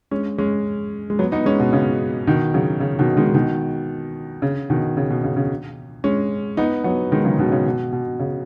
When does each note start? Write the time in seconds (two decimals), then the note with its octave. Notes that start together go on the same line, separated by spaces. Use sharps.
0.11 G#3 C#4
0.38 G#3 C#4
1.10 G#3
1.19 F#3 B3
1.32 B3 D#4
1.46 G#3 C#4
1.60 B2
1.73 C#3
2.27 B2 D#3
2.54 C#3 F#3
2.80 C#3
2.99 B2 D#3
3.17 D#3 G#3
3.34 B2 D#3
4.42 C#3
4.70 B2 D#3
4.97 C#3
5.10 B2
5.24 C#3
5.36 C#3
6.04 G#3 C#4
6.57 B3 D#4
6.84 F#3 B3
7.12 D#3 G#3
7.25 C#3 F#3
7.39 B2 D#3
7.52 C#3
7.66 B2
7.92 B2
8.19 C#3